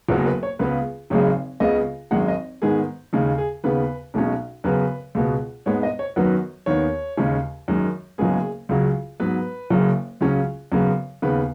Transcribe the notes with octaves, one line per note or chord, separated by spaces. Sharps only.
F#1 F#2 F#3 B3 B4
B4
C#5
C#2 C#3 B3 B4
G#1 F#2 C#3 G#3 C#5
C#2 C#3 B3 D#5
G#1 F#2 D#3 G#3 F#5
D#5
G#2 D#3 G#3 B3 G#4
D#2 C#3 G#3
G#4
D#2 C#3 B3 B4
B1 B2 G#3 C#4
F#2 C#3 B3 B4
C#2 B2 B3
G#2 G#3 B3 C#5
D#5
C#5
F#2 D#3 F#3 B3 B4
D#2 D#3 B3 C#5
D#2 C#3 G#3 C#4
F#2 D#3 G#3
F#1 F#2 C#3 G#3 B3 G#4
C#2 C#3 F#3
G#2 F#3 B3 B4
F#1 F#2 C#3
C#2 C#3 F#3 C#4
F#2 C#3 B3
D#2 C#3 B3 B4